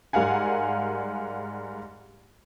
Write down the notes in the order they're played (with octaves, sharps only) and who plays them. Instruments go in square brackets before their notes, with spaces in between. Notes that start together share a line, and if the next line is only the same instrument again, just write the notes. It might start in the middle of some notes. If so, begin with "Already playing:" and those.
[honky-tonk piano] G#2 G3 A#4 F5 F#5 G#5